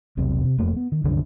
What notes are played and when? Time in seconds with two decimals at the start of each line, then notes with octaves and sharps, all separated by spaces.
0.17 E1 B1 C3
0.44 C3
0.58 E1 F2 A3 A#3
0.77 B3
0.92 D#3
1.04 C2 F#2 D3 D#3